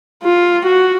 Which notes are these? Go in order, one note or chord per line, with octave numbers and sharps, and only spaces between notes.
F4
F#4